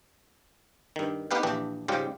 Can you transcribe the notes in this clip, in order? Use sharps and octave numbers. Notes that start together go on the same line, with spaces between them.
G2 D#3
B3 D#4 G4 B4 F5 G5
A#1 E3 D4 G4
G#2 C#3 G3 F4 G4